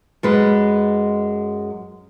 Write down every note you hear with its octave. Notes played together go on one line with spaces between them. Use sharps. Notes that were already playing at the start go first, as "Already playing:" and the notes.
F#2 G#3 B4